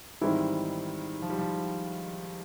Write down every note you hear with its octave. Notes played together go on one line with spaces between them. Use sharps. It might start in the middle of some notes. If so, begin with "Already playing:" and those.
G#2 D#3 E3 G3 C4 E4
F3
G3
F3